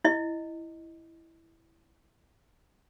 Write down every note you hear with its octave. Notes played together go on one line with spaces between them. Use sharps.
E4 D#5